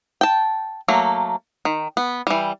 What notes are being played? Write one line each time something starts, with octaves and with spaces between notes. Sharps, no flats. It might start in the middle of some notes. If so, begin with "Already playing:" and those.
G5 A5
F#3 A3 A#3
D#3
B3
E3 G3